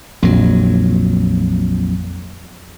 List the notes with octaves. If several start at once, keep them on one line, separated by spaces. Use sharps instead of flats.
A#1 F2 F#3